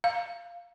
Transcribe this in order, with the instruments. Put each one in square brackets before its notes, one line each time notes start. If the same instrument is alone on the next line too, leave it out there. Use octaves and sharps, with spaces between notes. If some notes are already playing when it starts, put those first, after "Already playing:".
[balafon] F5